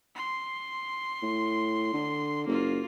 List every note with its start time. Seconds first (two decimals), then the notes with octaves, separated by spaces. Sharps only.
0.16 C6
1.22 A2
1.93 D3
2.47 F#1 A#3 F4